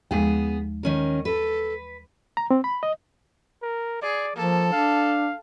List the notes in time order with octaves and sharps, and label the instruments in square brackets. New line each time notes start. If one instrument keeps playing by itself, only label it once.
[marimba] D#2 F3 G#3 [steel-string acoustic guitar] B3 G#4
[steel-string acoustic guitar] D#3 C#4 A#4
[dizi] A4 [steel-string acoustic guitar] B4
[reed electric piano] A#5
C4
B5
D#5
[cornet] A#4
[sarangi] G#4 [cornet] D5
[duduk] F3 [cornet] A#3 [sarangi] A4
[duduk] D4 [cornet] F5